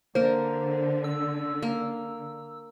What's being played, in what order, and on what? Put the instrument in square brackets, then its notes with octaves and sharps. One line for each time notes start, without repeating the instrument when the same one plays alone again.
[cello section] D3 [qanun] A#3 A#4 [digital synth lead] C5
[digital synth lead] E6
[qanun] A#3